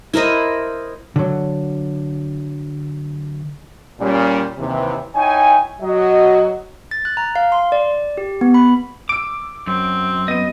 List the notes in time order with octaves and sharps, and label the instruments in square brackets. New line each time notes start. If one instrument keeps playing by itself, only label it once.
[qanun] E4 A#4 C5 D#5
[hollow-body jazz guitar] D3 F#3
[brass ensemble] A#2 G3 C#4
D#2 C3 E3
D#4 E4 C#5 G5 G#5
F#3 F#4 D#5
[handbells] A6
F#6
A#5
F5
C6
D5
G4
B3
B5
[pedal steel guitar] D6 [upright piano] E6 D7
[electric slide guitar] F#2 [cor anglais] C4
[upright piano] B3 D#7 [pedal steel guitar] D#5